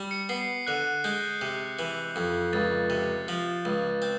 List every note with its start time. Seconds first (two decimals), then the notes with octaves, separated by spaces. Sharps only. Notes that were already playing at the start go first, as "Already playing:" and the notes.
Already playing: G3
0.11 C#7
0.29 B3 C7
0.67 D3 F#6
1.04 G#3 G6
1.41 C3
1.79 E3
2.16 F2
2.53 C#2 A6
2.90 C3
3.28 F3
3.65 C#2
4.02 C4 G6